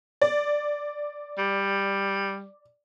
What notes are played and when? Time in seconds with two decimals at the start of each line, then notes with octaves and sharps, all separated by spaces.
0.22 D5
1.38 G3